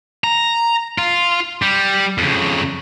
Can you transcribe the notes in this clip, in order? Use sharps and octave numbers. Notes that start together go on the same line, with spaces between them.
A#5
F4
G3
F2 C#3